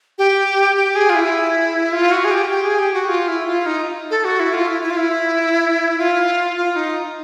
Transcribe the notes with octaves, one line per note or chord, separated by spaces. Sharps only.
G4
G4
G#4
F4
E4
F4
F#4
G#4
G4
G4
G#4
G4
F#4
F4
E4
F4
D#4
A4
F#4
E4
F4
E4
E4
F4
E4
F4
F4
D#4